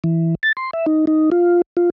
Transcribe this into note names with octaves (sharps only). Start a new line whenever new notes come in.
E3
A6
C6
E5
D#4
D#4
F4
F4